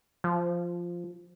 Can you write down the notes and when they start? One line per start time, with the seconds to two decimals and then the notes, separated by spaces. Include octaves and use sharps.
0.24 F3